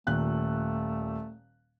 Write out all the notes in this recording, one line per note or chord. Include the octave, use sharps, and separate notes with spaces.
D#1 A#2 A3 F#6